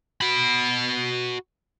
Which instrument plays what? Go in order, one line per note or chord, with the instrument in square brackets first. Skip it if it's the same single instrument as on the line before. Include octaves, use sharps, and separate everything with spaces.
[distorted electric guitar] F#4 B5